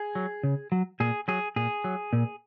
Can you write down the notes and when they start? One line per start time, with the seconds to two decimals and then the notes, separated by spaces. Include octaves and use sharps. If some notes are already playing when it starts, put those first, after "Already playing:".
Already playing: G#4
0.15 F#3
0.43 C#3
0.72 F#3
1.00 A#2 G#4
1.28 F#3 G#4
1.56 A#2 G#4
1.84 F#3
2.13 A#2